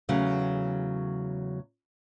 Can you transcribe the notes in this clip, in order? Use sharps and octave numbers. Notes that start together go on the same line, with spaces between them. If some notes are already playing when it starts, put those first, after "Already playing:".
E2 C#3 F#3 A3